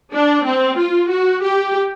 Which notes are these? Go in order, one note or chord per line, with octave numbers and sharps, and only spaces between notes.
D4
C4
F4
F#4
G4